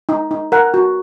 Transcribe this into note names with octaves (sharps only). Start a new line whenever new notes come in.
D#4
D#4
A#4 F#5
F#4